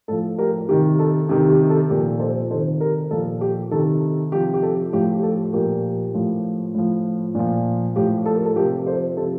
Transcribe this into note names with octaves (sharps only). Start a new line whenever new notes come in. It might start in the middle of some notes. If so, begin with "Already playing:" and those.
A2 F3 A4
G4 A#4
C3 D#3 G4
A4
C3 D#3 G4
G4
A4
A#2 F3 G4 A#4
A4 C5
C3 D#3 A4 C5
G4 A#4
A#2 F3 A4
G4
C3 D#3 A4
C3 F3 G4
G4
A4
A2 F3 G4
G4
A4
A#2 F3 G4 A#4
A2 F3
A2 F3
A#2 F3
A2 F3 G4
A4
A#4
A4
C3 F3 G4 A#4
A4 C5
C3 F3 A4